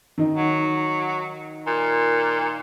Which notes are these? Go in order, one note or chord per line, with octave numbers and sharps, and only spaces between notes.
D#3 D#4
F#3
A#2